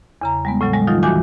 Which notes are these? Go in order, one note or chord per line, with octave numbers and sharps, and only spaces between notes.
E2 C#3 A#5
G3 G#3 B3
A2 C#3 F#3
G3 G#3
D#3 F3 F#3 D#4 F4
D#2 E3 F#4 G#5 D6 G6